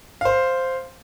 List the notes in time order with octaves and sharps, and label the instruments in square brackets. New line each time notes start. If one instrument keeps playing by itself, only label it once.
[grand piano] C5 F5